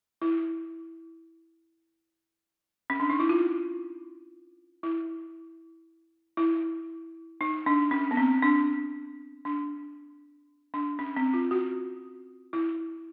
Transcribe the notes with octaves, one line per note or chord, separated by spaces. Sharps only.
E4
C#4
D4
D#4
E4
F4
E4
E4
D#4
D4
C#4
B3
C4
D4
D4
D4
C#4
C4
F4
F#4
E4